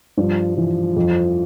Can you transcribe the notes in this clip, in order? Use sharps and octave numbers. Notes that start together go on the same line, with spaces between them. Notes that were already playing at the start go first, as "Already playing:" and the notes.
G2 F3
E3 F3
F2